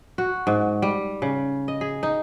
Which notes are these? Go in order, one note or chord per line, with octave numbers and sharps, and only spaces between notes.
F#4
G#2
G3
C#3
D#5
G#4
D#4